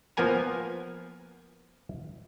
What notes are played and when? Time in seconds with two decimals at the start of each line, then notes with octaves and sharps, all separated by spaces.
0.17 F3 A#3 B3 A#4 G#5 A#5